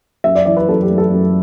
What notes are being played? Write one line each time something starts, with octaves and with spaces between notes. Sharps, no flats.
F#2 E5
D5
E3 D5
B4
F#2 A4
G4
A3
A4
F#2